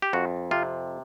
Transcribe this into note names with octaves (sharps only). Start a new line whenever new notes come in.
G4
F2 F#4
C3 F4